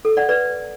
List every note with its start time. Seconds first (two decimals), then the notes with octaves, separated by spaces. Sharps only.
0.05 A4
0.17 D5 F#5
0.29 B4 D5